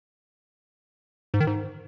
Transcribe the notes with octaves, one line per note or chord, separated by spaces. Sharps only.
G#2
D#3
G#2